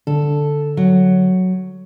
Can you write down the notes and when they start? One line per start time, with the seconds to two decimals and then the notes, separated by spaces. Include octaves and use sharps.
0.07 D3 A4
0.77 F#3